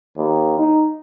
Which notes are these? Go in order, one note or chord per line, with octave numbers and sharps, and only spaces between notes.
D#2
D#4